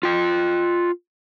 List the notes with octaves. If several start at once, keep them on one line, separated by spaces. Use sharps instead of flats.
F4 G5